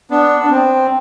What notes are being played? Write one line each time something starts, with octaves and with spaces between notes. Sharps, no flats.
B3 D4
D4
C4